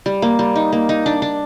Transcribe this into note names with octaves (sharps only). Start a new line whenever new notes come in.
G3
A#3
G3
D#4
A#3
D#4
D4
D4